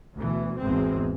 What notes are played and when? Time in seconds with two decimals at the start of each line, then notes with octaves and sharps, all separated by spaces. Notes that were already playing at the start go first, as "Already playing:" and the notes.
0.15 D2 B2 E3
0.59 G#1 E2 G#3 C4